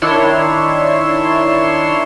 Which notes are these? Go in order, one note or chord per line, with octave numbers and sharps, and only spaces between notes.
D#3 D4 E4 C#5 C6 E7